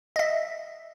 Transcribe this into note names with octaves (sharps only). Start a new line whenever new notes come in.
D#5 E5